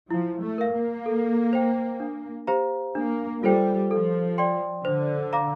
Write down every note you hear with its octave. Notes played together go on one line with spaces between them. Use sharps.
F3 E4
A3
A#4 F5
A#3
A4
C5 G5
D4
G4 C5 F5 A#5
A#3 D4
G3 F4 A4 C5 G5
F3 A4
D5 G5 C6
D3 C5
F5 A#5 D6